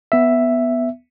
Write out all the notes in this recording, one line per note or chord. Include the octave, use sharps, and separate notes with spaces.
B3 E5